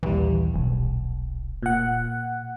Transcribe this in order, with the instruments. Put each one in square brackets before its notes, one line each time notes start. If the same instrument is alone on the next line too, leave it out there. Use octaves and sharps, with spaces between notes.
[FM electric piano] A#1 D#2 G3 [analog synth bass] E3
[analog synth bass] D#1 [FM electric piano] B1
[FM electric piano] A#2 F#5